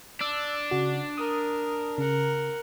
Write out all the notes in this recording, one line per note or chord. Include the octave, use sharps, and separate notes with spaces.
D4 D6 E6
C#3 F#4
A#4 D#6
C#3 A#4 F#5